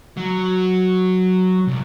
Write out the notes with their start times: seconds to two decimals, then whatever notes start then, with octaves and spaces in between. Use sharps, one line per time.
0.17 F#3
1.68 C2